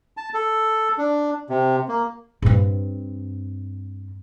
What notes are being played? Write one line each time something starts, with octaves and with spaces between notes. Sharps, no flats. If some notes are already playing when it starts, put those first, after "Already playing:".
A5
A4
D4
C3
A#3
G2 C4